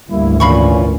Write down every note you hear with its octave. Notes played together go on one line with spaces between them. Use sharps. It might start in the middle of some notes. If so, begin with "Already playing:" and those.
G#1 D2 G3 A#3 E4
A#2 E3 C#4 F5 B5 C#6